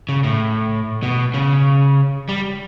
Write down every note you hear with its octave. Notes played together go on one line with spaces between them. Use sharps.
C#3
A2
B2
C#3
G3